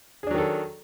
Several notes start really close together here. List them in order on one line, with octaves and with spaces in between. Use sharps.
G#4 D4 F#3 D#3 A4